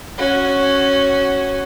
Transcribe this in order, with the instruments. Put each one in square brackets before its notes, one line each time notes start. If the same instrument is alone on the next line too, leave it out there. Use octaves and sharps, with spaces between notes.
[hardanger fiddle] C#4 F#4